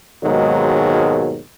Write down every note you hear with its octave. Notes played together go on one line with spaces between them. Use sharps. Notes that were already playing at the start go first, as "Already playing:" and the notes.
D#2 G#2 B2 D#3 F#3 G#3